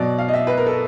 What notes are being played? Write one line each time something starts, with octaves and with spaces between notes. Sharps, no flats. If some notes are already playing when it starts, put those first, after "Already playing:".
Already playing: B2 F#3 D5
F5
D#5
E5
B4
A#4
A4